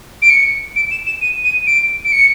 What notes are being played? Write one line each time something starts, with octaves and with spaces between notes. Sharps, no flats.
D7
C#7
D7
E7
E7
D#7
D#7
D7
D7
C#7